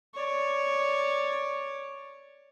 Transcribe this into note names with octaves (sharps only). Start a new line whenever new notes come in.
C#5 D5